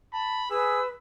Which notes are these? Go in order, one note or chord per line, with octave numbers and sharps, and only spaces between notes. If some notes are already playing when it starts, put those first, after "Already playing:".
A5 B5
G#4 B4 E6